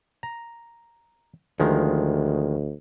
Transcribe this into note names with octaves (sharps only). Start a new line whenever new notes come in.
A#5
D2 D#3 F3 G#3